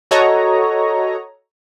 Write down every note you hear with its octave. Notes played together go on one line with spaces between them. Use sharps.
F#4 A4 C#5 D#5 A#5